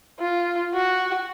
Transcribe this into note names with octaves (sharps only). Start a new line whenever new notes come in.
F4
F#4